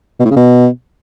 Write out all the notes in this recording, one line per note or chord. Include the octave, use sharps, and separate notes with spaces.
B2
A2
C#3
B2